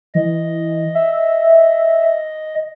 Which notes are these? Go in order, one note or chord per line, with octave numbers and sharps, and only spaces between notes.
E3 D#5
E5